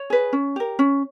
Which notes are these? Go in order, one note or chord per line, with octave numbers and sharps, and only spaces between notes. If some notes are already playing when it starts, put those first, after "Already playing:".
Already playing: C#5
G#4 B4
C#4
G4 A#4
C#4